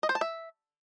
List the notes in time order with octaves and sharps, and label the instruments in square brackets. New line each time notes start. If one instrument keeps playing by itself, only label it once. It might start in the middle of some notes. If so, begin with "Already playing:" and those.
[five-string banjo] D#5
C5
A5
E5